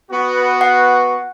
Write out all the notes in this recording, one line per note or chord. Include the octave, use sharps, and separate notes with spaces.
B3 F#4
F#5